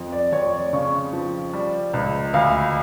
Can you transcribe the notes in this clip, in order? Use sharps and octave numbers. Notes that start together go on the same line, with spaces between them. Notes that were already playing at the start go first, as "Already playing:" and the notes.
Already playing: F2
D5
F2 C#5
D5
C#3 C#6
F3
G3
C#2
D2 F5